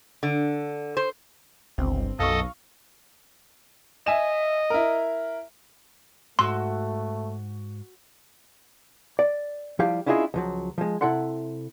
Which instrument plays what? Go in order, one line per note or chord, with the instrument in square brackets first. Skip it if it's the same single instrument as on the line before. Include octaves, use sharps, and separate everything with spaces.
[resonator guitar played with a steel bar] D3
C5
[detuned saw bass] G1 [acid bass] C#2 [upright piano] C4
[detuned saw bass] B1 [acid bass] F#2 [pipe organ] A4 D#5 [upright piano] F5 C#6
[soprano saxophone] D#5 [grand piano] E5 G#5 E7
[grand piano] E4 A#4
[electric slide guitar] G#2 [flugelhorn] A3 [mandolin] F#4 E6 [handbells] C6
[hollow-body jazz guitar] D5
F3 G3 E4 G4 F5
C#4 D4 E4 F4 G#4 D#5
C#2 F3 F#3
F3 G#3
C3 E4 A4 F#5 C6